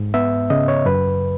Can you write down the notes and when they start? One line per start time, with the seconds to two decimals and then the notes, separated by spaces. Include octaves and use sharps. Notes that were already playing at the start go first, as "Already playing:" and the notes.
Already playing: G#2
0.14 B3 E5
0.50 C#3 D#5
0.68 C#5
0.86 F#2 B4